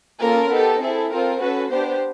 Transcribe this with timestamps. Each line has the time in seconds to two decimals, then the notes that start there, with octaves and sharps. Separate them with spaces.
0.21 A#3 C#4 F4 A4 A#4
0.50 B3 D#4 G4 A4
0.80 C4 E4 G#4 A4
1.09 C4 F4 A4 A#4
1.39 C#4 F#4 A4 B4
1.68 B3 D4 G4 C5